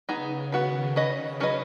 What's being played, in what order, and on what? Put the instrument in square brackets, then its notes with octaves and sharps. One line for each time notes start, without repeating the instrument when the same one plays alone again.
[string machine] C#3 [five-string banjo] B3 D#4 G#4
[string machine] D#3 [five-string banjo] B3 F#4 B4
[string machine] C#3 [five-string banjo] C#4 B4 D#5
[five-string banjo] F#3 C#4 B4 D#5